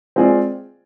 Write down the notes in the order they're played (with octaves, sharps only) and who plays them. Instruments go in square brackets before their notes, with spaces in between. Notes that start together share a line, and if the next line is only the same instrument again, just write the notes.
[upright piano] G#3 C4 F4 G#4 D5